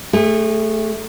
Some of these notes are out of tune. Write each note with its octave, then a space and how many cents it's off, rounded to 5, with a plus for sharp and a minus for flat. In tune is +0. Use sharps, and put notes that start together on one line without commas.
A3 +0 G#4 -30